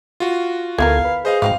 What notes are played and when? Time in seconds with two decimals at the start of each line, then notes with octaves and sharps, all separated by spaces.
0.20 F4 F#4
0.78 D2 B3 E4 A4 A#4 F5 G#6
1.05 B4
1.25 G#4 C5 D#5 F5
1.42 G#2 F#3 C4 D#4 F5